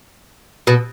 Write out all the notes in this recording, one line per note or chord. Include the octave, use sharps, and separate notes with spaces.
B2